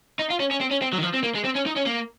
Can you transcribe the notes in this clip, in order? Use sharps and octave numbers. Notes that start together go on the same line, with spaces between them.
D#4
F4
C#4
C#4
C4
C#4
C4
F#3
D#3
F3
C4
A#3
G#3
C4
C#4
D#4
C#4
A#3